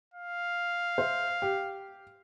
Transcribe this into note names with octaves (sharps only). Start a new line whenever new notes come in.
F5
C5 E5
G4